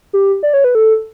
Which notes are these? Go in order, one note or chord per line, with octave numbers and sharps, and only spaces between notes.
G4
D5
C#5
B4
A4